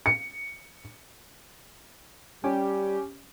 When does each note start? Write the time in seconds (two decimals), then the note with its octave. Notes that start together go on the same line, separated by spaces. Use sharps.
0.06 C#7
2.44 G3 C#4 G4